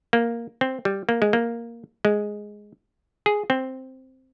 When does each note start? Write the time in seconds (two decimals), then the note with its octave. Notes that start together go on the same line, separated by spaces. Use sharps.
0.13 A#3
0.61 C4
0.85 G3
1.09 A#3
1.22 G#3
1.33 A#3
2.05 G#3
3.26 G#4
3.50 C4